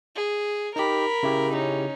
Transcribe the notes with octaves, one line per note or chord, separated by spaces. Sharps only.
G#4
D#4 G4 A#4 B5
C#3 E4 G4
C#4 D#4